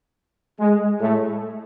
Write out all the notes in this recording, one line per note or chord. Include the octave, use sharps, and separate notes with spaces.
G#3
A2 A3